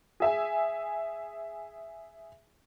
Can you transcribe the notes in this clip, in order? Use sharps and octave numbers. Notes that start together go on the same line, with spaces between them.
G#4 E5 G#5